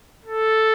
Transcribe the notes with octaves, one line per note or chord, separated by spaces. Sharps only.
A4